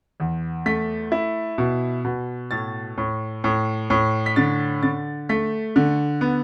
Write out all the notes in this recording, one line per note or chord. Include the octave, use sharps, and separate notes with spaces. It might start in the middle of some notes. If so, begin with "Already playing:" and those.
E2
A3 B6
E4
B2
B2
A2 A6
A2
A2
A2
B6
D3 A6
D3 A6
A3 B6
D3
B3